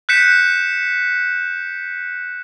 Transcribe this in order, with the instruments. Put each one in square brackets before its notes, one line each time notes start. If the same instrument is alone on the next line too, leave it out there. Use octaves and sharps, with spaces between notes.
[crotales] F#6 G6 B6 C#7 E7